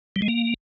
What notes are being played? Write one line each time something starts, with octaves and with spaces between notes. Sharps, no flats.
G3
G#3
A#3